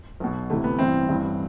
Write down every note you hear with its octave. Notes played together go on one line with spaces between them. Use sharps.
B1 B2
D2 C3 E3 A3
B3
A1 G2 E3 C4
A1 G2 E3